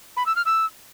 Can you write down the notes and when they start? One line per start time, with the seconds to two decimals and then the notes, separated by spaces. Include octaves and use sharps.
0.17 B5
0.26 E6
0.36 F6
0.46 E6